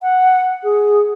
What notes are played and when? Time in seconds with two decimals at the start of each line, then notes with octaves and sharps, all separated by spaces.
0.02 F#5
0.63 G#4